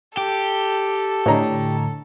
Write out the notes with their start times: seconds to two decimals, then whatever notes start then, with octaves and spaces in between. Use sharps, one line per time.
0.17 G4 A4
1.26 A2 D3 C#5 D#5 A#5